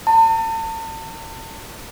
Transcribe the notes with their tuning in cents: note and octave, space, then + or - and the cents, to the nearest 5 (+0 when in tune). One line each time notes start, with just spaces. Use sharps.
A5 +40